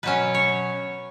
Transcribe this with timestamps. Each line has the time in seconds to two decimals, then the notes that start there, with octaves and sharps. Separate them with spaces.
0.03 B2 F#3 C#4 B4
0.35 C#5